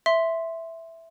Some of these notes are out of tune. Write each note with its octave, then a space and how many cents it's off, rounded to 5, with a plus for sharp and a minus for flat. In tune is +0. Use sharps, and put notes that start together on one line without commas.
E5 +0 C6 +0